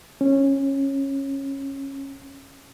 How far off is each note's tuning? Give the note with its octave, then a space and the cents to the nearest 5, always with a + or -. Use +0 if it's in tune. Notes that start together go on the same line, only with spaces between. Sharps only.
C#4 -15